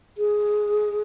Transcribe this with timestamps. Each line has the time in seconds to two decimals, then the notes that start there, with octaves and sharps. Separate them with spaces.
0.18 G#4